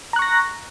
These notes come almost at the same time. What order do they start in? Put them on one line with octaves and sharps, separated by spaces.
A#5 F#6 C#6 A#6